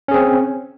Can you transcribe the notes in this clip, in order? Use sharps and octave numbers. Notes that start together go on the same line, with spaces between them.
C4 C#4 G#4